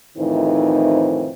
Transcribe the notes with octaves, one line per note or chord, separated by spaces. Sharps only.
F2 A2 D#3 E3 C4 D#4